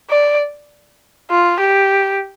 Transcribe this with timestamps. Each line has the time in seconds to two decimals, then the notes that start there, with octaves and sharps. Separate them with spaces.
0.10 D5
1.31 F4
1.60 G4